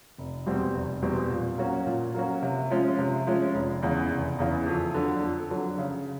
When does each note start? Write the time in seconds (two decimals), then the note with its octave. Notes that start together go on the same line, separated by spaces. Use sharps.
0.18 F1
0.46 E2 B2 G3 C4
0.74 F1
1.02 E2 B2 G3 C4
1.30 A#2
1.58 F#3 A#3 C#4 F#4
1.87 A#2
2.15 F#3 A#3 C#4 F#4
2.42 C3
2.70 F3 G#3 C#4
2.99 C3
3.27 F3 G#3 C#4
3.54 F1
3.83 E2 C#3 E3
4.11 F1
4.39 E2 C#3 E3
4.66 F2
4.94 D3 F#3
5.22 F2
5.50 D3 F#3
5.78 C#3